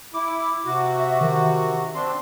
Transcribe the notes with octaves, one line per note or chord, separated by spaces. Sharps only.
E4 D6
C3 F#4
E5
D#3
C4 D4 C6